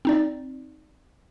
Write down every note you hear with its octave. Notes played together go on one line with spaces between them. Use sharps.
C4 D#4 D5